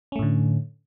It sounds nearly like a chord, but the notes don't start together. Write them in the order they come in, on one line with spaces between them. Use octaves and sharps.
C#4 A3 A2 D3